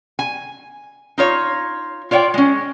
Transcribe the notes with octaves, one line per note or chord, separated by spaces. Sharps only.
G#5
D#4 F4 C#5
F4 C#5 D5 F5 G5
G#3 C#4